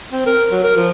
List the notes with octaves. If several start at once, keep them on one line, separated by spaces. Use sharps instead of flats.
C4
A#4
F#3
A#4
F3